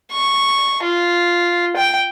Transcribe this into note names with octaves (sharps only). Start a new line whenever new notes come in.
C#6
F4
G5